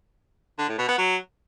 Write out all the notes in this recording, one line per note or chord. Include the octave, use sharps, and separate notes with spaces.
D3
A2
B2
B3
F#3